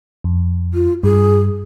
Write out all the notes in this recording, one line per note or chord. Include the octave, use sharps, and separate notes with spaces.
F2
F4
G2 G#4